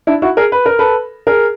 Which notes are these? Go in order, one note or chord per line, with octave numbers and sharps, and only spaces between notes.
D4 E4
E4 F#4
G#4 A#4
B4
A#4
A4 B4
G#4 A#4